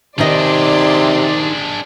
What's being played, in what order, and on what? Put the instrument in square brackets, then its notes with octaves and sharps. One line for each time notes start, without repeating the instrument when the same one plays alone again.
[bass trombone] C3 [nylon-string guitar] D#3 D#4 D#5 [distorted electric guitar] D4 G#4 [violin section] D5 C6